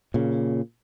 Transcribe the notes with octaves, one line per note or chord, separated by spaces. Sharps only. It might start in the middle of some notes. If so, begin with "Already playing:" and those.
A#2 C#3